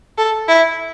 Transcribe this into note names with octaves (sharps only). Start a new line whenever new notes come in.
A4
E4